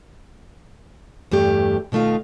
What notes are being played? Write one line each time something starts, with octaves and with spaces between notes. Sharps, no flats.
E2 G2 A3 G4
B2 D#3 A3 F4 F5